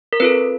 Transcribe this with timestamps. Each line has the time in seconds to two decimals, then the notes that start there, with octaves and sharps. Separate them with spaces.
0.13 A#4
0.20 C4 F4 A4 B4